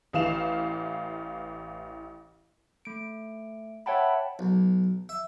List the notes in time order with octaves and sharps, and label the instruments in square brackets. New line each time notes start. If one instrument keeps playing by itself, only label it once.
[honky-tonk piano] A1 E3 F5 E7 F7
[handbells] A3 D7
C#5 E5 F#5 G5 A5 B5
[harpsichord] B1
E5